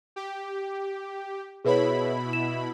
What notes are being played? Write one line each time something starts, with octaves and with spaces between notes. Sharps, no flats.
G4
B2 E4 G#4 B4 C#5 B5
E7